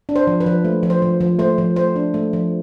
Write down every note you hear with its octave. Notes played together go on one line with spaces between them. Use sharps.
D4
C5
F3
B4
F3
A3
F3
C5
F3
F3
A3 C5
F3
A3 C5
D4
A3
F3